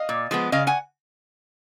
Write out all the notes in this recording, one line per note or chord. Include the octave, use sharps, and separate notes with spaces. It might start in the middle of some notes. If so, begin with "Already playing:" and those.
Already playing: D#5 F5
A#2
F3 G#3 B3
C#3 D#5 F5
F#5 G#5